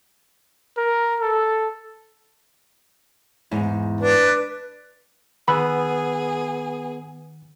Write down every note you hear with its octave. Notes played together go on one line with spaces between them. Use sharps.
A#4
A4
E2 G#2
D4 B4
D#3 B3 G#4 B4 B5 E6 F#6